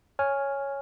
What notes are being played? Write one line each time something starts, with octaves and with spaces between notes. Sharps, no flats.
C#5 G#5 F6